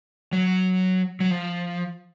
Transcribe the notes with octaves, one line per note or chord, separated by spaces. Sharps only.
F#3
F#3
F3